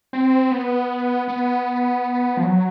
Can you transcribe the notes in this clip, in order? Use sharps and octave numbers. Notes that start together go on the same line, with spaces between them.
C4
B3
B3
F3
F#3